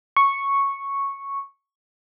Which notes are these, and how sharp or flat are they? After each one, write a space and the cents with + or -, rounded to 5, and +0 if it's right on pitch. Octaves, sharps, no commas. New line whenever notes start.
C#6 -5